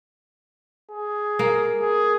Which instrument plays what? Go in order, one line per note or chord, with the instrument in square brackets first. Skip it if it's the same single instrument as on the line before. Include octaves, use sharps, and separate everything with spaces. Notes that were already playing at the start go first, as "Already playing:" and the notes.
[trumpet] G#4
[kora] A#3
[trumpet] G#4